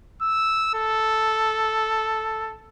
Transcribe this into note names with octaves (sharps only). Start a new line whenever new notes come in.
E6
A4